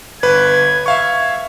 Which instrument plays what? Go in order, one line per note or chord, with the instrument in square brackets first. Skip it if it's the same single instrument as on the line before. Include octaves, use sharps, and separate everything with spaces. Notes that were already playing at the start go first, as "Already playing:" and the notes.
[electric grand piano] G1 B4 [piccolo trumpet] G#6
[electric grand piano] E5 F5 C#6